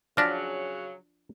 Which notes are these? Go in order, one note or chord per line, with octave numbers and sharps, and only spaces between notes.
C#3 F3 F#3 D4 F6 A#6 B6